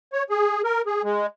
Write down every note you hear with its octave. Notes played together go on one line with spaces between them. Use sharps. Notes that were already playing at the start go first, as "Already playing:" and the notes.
C#5
G#4
A#4
G#4
G#3